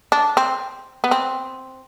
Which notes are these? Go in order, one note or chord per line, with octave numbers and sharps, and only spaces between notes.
D4
C4
B3
C4